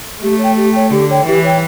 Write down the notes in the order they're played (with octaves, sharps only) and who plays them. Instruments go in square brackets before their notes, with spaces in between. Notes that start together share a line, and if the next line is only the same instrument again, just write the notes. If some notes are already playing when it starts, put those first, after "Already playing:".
[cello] A3 [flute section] G4
[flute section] C#5 G5
G4
C#5 G5
[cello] D3 [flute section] G4
[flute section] C#5 G5
[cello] E3 [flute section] G4
[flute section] C#5 G5